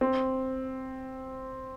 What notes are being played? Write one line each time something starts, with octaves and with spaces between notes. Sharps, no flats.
C4